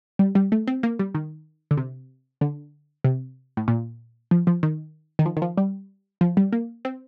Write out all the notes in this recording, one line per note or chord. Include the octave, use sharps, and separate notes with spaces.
G3
G3
A3
C4
A#3
G3
D#3
D3
C3
D3
C3
A2
A#2
F3
F3
D#3
D#3
F3
D#3
F3
G3
F3
G3
A#3
C4